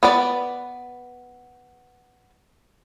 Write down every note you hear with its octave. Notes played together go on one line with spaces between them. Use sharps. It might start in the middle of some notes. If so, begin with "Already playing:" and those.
B3 B4 D5